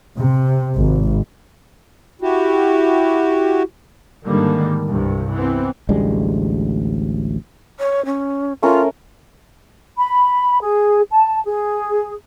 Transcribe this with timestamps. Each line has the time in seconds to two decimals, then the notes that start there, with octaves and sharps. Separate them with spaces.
0.18 C3
0.76 G#1
2.22 E4 F#4 G4
4.26 G#2 D3 D#3 G3 A#3
4.87 C2 G2 C3
5.31 E3 B3 C4
5.89 A1 D2 G3 G#3
7.78 C#5
8.05 C#4
8.62 A3 C#4 F4 A#4
9.97 B5
10.62 G#4
11.11 A5
11.46 G#4